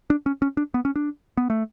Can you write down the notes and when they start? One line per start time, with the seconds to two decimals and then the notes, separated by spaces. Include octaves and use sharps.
0.10 D4
0.26 C#4
0.42 C#4
0.57 D4
0.74 B3
0.85 C#4
0.96 D4
1.37 B3
1.50 A3